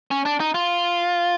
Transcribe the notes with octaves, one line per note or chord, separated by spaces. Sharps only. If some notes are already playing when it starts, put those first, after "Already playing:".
C#4
D4
D#4
F4